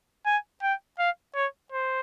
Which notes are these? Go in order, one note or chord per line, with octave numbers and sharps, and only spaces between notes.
G#5
G5
F5
C#5
C5